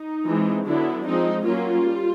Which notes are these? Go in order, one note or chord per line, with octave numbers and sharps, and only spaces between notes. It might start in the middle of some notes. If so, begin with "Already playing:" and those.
Already playing: D#4
E3 G#3 C4
D3 F#3 B3 D4 E4
F3 G#3 C4 D#4
F#3 A#3 C#4 F4
G3